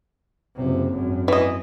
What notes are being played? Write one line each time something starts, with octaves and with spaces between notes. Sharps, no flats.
F#1 C3
G#1 F#2
E3 D#5